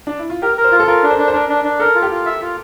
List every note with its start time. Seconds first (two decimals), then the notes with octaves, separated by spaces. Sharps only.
0.07 D4
0.19 E4
0.30 F4
0.42 G4 A#4
0.58 A#4
0.64 C5
0.72 F4
0.80 A4
0.87 F4 A#4
1.03 D4
1.11 C5
1.18 D4
1.28 C5
1.33 D4 A#4
1.49 D4
1.65 D4
1.80 A4 A#4
1.95 F4
2.02 G4
2.11 F4
2.26 E5
2.42 F4